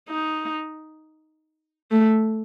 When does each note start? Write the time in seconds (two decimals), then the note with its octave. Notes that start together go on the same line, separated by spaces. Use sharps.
0.09 D#4
1.91 A3